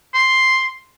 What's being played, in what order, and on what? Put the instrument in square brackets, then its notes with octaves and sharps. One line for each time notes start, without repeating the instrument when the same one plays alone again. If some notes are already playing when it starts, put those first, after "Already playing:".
[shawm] C6